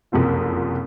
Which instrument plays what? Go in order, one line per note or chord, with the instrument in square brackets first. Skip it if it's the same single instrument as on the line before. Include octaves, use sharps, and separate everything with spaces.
[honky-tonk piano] F#1 C2 F2 C4 F4